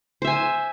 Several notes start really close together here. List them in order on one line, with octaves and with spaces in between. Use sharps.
C5 E5 G#5